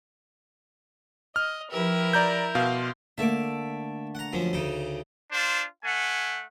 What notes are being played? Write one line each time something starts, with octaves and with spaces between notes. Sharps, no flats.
D#5 F6
F3 E4 G4 A#4 B4
D5 A#5 G6
B2 F5 C6 D6
D3 A3 A#3 E5 D6
F#5 A#5
F#2 F3 C#4
D2 C#3 D#4
D4 F4 C5
A3 F#5 G#5